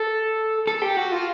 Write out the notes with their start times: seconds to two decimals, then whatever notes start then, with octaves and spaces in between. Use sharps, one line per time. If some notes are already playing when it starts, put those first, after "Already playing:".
Already playing: A4
0.67 A4
0.82 G4
0.97 F#4
1.11 F4